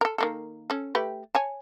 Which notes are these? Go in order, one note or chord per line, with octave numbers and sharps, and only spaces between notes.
A4 A#4
D#3 A#3 A4
C#4 A4
A3 G4 B4
C#5 G#5 A5